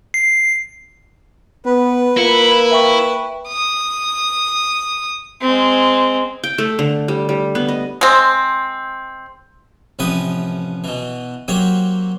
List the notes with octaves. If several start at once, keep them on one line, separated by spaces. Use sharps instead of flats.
C7
B3 B4
A#3 E4 F4 C#7
E5 G5 C#6
D#6
G#3 C4
G5
A3
D3
G3
G3
B3
D#5
G#3 C4
A1 C3 F3 B4 F#5 D#6
B2 E3
F#3 A#3 C4 G4 C#5